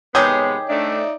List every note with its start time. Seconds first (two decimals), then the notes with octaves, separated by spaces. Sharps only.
0.15 C3 D#3 G#3 B3 G4 G#4 C#5
0.69 A3 D4 D#4 D5 E5